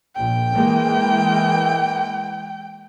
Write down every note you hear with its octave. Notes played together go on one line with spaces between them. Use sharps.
A#1 G5
E3 G#3 A#3